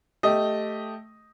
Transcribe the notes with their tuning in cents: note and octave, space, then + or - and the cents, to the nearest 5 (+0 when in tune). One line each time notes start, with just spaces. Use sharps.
A3 +0 G4 +0 D#5 +0